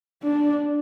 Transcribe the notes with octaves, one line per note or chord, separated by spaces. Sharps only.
D4